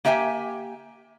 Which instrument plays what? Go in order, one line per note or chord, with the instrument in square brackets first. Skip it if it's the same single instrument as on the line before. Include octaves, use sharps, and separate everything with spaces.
[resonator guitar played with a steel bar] A#3 G4 E5 G5 G#5